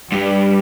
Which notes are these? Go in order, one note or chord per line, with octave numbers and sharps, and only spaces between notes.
G2 G3